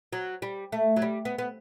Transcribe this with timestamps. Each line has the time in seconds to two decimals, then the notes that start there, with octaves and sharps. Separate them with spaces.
0.13 F#3
0.42 G3
0.72 A3
0.96 F#3
1.02 G3
1.25 B3
1.38 B3